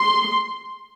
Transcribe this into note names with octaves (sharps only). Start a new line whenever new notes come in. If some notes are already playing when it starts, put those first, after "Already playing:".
Already playing: C6